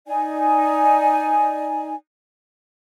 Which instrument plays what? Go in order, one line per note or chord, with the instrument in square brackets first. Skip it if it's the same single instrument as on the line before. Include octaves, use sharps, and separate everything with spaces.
[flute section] D#4 D5 G#5